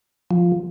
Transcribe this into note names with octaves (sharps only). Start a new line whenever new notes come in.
F3